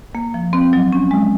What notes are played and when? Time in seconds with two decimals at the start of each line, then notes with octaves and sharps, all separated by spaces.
0.15 A#3
0.34 F3
0.53 C4
0.73 F#3
0.93 C#4
1.11 G#3